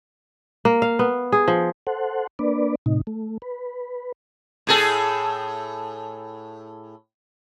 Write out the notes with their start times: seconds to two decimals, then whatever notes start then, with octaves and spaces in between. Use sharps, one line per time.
0.65 A#3
0.82 F5
0.99 B3
1.32 G#4
1.48 F3
1.87 A4 C5 F#5
2.39 A#3 D4 B4 D5
2.86 A2 C3 D#4
3.07 A3
3.42 B4
4.67 A2 G#4 A4